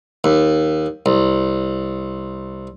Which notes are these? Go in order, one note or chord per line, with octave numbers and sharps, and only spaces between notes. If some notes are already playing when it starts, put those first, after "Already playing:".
D#2
C2